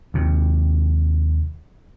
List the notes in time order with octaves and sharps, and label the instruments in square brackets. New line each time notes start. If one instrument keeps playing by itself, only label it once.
[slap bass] D#2 C3